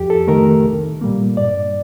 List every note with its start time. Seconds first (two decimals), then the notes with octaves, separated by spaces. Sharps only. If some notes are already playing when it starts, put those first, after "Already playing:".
Already playing: F2 G4
0.10 A4
0.28 D#3 A3 A#4
0.64 C2
1.01 A#2 G3 A#3
1.37 G2 D5